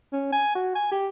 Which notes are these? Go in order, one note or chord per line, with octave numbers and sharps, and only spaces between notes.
C#4
G#5
F#4
G#5
G4